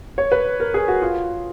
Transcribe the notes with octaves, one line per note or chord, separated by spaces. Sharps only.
C#5
B4
A#4
G#4
F#4
F4